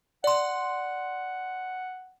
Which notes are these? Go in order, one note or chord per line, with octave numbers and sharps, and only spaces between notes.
D5 F#5 C6